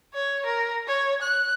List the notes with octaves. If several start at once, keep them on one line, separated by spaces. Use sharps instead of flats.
C#5
A#4
C#5
F#6